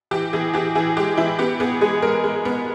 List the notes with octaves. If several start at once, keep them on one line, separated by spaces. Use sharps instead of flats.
E3 G4
E3 G#4
E3 G4
E3 G#4
G#3 G4
E3 E4
B3 G4
B3 G#4
G#3 G#4
G#3 A#4
G#3
B3